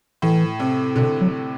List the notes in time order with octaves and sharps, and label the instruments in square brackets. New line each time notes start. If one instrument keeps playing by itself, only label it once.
[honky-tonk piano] A2 [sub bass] E3
[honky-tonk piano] C3
[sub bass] B2 [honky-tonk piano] D3
[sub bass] F#3